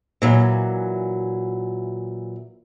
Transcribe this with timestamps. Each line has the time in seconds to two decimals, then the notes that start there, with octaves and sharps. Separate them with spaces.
0.22 A#2 E3 F#3